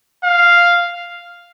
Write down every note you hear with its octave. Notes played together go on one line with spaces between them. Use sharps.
F5